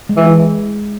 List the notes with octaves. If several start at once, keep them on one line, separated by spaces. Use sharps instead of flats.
G#3
E3
E4